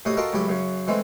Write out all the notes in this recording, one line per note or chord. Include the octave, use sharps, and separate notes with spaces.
A2 C3 F#4 D#5 C#6 D#6
F4 F#4 A4 A#4 D#5 G5
C#2 A2 F#3 G4 B5
F#2 C#3 F#3
E3 G#3 A3 C4